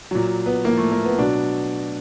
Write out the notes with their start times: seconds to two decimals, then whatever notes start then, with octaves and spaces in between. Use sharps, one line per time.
0.11 A#2 F#3
0.46 B3
0.64 A2 F3 A#3
0.78 A3
0.92 A#3
1.05 B3
1.18 B2 F#3 D4